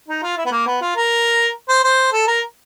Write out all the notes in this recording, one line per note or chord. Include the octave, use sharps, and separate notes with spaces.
D#4
F4
E4
B3
A#3
B3
F4
A#4
C5
C5
A4
A#4